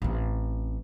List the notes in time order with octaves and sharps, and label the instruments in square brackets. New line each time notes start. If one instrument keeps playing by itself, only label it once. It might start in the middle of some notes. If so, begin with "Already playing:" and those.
[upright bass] A1 C4